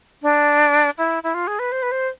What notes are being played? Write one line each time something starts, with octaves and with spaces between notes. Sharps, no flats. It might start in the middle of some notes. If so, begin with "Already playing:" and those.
D4
E4
E4
F4
G#4
B4
C5
B4
C5